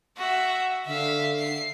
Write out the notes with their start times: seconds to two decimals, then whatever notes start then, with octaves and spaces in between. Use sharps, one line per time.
0.17 F#4 E5
0.86 D3 E5 F5
1.39 C7